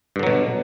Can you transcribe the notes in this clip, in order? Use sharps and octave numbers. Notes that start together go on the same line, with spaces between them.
G2 B2 D3 F#3